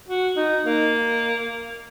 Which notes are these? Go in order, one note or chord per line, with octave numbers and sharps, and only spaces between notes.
F#4
D#4
A#3